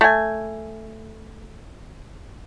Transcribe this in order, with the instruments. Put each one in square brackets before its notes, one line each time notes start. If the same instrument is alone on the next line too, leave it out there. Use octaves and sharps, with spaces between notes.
[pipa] A3 G#5